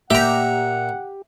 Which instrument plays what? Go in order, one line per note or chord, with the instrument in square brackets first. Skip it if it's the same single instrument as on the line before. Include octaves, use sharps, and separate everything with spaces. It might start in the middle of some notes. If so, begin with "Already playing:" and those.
[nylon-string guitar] A#2 A#3 A#4 [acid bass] G4 [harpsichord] E5 A#5 [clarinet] F#5